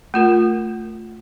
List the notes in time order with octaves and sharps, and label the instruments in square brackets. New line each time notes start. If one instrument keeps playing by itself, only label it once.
[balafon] A3 F4 A#4